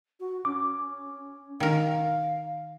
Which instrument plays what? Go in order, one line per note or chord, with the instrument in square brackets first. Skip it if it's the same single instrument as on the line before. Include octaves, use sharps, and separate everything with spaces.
[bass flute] F#4
[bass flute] C#4 [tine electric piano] D6
[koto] D#3 A#4 [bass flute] F5